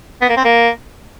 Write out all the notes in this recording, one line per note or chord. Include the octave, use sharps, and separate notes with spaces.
B3
A#3
C4
A#3